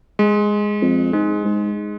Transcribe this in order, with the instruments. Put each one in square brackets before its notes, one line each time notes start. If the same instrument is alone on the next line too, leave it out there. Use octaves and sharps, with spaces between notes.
[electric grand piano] G#3
[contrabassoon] F2
[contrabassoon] G#2 [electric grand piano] G#3
[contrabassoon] G#2